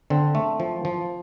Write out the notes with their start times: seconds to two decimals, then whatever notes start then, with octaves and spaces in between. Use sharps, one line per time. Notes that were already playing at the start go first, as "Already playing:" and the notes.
0.10 D3 C4
0.35 A3
0.60 F3
0.85 F3